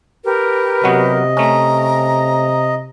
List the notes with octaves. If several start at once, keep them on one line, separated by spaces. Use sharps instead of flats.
G4 A#4 B4
C3 F#3 B3 F#4 D#5
A3 C#4 A#5